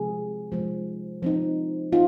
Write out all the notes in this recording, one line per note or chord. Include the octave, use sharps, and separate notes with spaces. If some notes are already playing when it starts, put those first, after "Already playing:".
Already playing: C3 F3 G#3 G#4
C3 F3 G#3
F3 C4 D#4
C4 D#4 F4